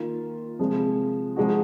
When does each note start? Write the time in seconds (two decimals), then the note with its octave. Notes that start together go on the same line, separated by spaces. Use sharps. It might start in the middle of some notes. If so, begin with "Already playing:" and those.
Already playing: D#3 A#3 F4
0.59 C3 F3 G#3
1.36 F3 G#3 D#4 F#4